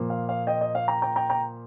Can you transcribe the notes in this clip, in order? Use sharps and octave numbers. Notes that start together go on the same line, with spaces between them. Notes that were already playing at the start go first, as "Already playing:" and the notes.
Already playing: A#2 F3 A#3
F5
F5
D#5 G5
D#5
F5
G5 A#5
G5 A#5
G5 A#5
G5 A#5